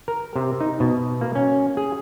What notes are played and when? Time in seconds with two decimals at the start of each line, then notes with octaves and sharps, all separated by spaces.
0.08 A#4
0.36 C3
0.61 D#4
0.80 B2
1.21 A#3
1.35 C#4
1.77 G#4